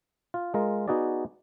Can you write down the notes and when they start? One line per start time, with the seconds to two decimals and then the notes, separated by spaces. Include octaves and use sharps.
0.34 F4
0.54 G#3 F4 A#4
0.88 B3 D#4 F#4 G#4 D5